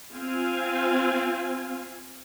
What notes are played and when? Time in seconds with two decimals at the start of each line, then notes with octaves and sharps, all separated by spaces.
0.12 C4 F4 F5 G#5